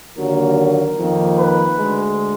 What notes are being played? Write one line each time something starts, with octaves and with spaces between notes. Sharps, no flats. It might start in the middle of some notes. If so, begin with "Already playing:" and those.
D#2 D3 F#3 A#3 A#4
F2 D#3 A#3
B4
D2 D3 G#3